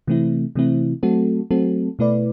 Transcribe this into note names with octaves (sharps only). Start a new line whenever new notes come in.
C3 E3 A3 C4 E4
C3 E3 A3 C4 E4
F#3 A3 C4 F#4 A4
F#3 A3 C4 F#4 A4
B2 A3 E4 B4 D5